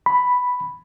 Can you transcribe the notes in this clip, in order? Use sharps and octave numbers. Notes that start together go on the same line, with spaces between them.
B5